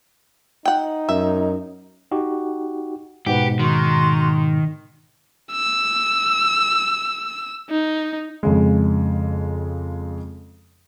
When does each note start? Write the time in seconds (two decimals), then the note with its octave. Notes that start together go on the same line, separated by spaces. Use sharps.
0.65 D#4 F#5 G5
1.09 F#2 E5
2.11 D#4 F#4 G4
3.26 G#2 B2 G4 B4 F#5
3.59 D#3 F#4 A#5 C6
5.52 E6
7.70 D#4
8.43 F2 C#3 G#3